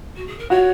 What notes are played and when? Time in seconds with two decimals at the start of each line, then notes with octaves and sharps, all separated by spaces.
0.16 F#4
0.27 G#4
0.39 A#4
0.50 F#4 C#5